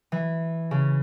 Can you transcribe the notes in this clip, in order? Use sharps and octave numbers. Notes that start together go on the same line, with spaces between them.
E3
C#3